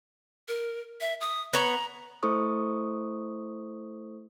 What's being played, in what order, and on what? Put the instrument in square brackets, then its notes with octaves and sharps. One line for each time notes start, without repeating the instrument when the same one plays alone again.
[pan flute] A#4
E5
D#6
[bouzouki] B3 C#5 [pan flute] A#5
[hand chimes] A3 E4 A4 C5 C#6 D#6